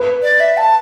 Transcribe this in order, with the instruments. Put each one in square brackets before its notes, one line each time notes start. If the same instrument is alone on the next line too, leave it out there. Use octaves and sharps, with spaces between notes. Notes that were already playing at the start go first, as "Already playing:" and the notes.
Already playing: [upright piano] B4
[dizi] D5
E5
A5